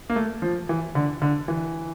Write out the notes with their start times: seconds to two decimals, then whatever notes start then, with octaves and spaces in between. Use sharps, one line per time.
0.10 A#3
0.16 A3
0.42 F3
0.69 E3
0.95 D3
1.22 D3
1.48 E3